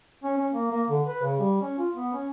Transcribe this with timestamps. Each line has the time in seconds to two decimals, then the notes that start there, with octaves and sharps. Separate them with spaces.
0.23 C#4
0.38 C#4
0.54 A#3
0.71 A#3
0.90 D3
1.08 B4
1.23 C#3
1.40 G3
1.62 C#4
1.79 F4
1.95 B3
2.13 C#4